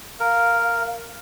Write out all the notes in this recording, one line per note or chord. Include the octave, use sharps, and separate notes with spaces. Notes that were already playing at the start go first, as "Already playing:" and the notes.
A#4 F5